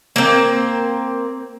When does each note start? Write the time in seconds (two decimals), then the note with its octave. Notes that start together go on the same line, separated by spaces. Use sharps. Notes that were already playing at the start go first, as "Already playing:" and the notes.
0.16 A#3 C4